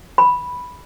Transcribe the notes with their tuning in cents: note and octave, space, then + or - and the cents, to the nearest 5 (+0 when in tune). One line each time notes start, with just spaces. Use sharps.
B5 +0